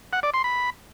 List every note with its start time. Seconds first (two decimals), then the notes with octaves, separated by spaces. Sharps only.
0.13 F#5
0.23 D5
0.34 C6
0.44 B5